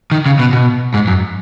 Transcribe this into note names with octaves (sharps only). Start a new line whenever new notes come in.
D#3
C#3
B2
B2
G#2
F#2